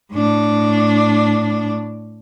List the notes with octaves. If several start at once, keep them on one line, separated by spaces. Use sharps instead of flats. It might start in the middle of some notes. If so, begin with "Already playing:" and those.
A2 D4